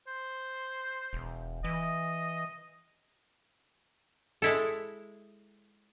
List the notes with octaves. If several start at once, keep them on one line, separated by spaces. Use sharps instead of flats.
C5
E1
E3 D#5
G#3 E4 A4